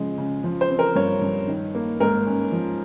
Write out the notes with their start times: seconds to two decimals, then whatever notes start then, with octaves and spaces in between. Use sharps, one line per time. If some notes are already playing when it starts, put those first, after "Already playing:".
Already playing: C#3 F3 G#3
0.18 C#3
0.44 F3
0.61 C5
0.70 C4
0.79 A#4
0.95 G2 C#5
1.22 G2
1.48 D#3
1.75 A#3
2.00 G#2 A#4
2.26 C#4
2.52 F3